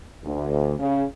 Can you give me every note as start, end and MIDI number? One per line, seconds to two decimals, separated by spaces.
0.23 0.75 38
0.79 1.03 49